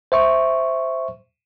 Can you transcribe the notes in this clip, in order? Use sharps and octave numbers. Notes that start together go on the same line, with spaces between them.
C5 E5 C#6